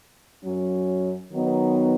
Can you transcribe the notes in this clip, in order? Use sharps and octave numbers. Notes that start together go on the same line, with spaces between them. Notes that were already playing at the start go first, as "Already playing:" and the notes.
F#2 F#3 C#4
D#3 F#3 B3 D#4